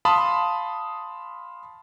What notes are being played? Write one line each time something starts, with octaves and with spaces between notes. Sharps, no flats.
F5 A5 B5 C6 D#6